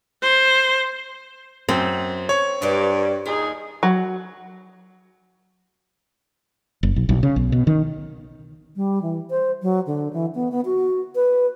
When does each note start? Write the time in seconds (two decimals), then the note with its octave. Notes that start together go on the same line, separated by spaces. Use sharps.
0.22 C5
1.69 F#2 C4
2.29 C#5 C#6
2.62 G2 G4 B4 D5
3.26 D#2 D#4 F4 G#4
3.83 F#3
6.83 F#1
6.96 B1
7.09 B1
7.23 C#3
7.36 B1
7.52 B2
7.67 D#3
8.76 G3
9.02 E3
9.31 C5
9.62 F#3
9.86 D3
10.13 E3
10.35 B3
10.52 B3
10.65 F#4
11.15 B4